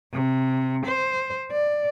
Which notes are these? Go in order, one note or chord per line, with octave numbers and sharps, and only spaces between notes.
C3
C5
D5